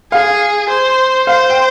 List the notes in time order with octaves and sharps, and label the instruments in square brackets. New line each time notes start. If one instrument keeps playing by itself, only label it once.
[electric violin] G#4 [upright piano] F5
[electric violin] C5
[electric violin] C5 [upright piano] F5
[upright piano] G5